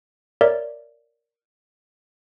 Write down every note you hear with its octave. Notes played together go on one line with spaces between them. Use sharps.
A#4 C#5 D5 E5